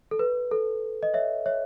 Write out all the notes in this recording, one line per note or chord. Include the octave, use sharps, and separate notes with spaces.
A4
B4
A4
D#5
C#5 E5
C#5 E5